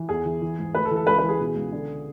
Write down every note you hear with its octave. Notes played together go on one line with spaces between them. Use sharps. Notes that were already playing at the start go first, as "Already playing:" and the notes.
Already playing: E3
E2 G#4
E3
E3
G#2
D2 B4
A4
E3
A4
C#2 B4
B4
E3
G#4
B2
C#2
D3